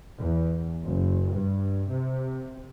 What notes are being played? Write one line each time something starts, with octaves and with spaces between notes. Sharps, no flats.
E2
F#1
G2
C3